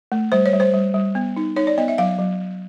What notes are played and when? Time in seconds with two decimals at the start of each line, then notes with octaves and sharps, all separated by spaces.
0.12 A3
0.32 G3 C5
0.46 C#5
0.53 G3
0.60 C5
0.74 G3
0.94 G3
1.15 B3
1.37 D#4
1.56 D#4 C#5
1.67 D5
1.78 B3 D#5
1.88 E5
1.98 F#3 F5
2.19 F#3